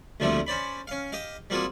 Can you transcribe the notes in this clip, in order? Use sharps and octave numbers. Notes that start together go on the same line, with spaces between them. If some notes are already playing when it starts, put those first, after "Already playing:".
D2 A#2 F3 G3 A3 C4
C#4 C5 D5 B5
C#4 F5
G4 D#5 F5
G3 A#3 C4 F4 F#4 G#4